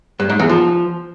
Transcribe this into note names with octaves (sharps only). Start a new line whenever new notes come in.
G2
G#2
E2
F3